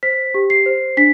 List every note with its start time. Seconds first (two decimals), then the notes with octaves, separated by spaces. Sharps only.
0.03 C5 B6
0.34 G4
0.50 C7
0.66 C5
0.97 D4 B6